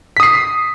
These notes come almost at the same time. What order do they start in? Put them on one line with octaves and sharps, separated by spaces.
B6 D#6 C7